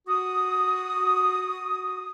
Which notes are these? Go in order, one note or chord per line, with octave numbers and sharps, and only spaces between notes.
F#4 D#6